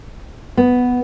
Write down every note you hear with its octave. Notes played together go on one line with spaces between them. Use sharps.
B3